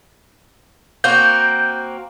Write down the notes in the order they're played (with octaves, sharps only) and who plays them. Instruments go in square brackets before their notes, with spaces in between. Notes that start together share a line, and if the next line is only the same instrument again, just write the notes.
[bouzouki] A#3 C4 F#4 [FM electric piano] G6